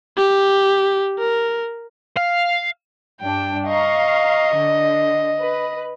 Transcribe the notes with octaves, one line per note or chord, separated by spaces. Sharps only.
G4
A#4
F5
G2 D4 G5
D#5 F5 A#5 C#6
D3
B4